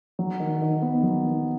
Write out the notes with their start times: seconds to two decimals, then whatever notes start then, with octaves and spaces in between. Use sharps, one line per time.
0.19 F#3
0.40 D#3
0.62 D#3
0.82 B3
1.03 F#3
1.25 D#3